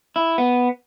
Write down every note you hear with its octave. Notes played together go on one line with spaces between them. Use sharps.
E4
B3